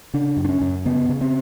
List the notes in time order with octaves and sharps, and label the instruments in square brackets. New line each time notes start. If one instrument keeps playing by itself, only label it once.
[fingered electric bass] C#3 D4
F#2
D4
C#4
F#2
C#3 B3
C#3
C4